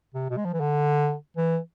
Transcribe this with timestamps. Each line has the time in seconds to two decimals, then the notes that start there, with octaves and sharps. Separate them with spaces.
0.14 C3
0.30 B2
0.37 G#3
0.45 F3
0.53 E3
0.60 D3
1.37 E3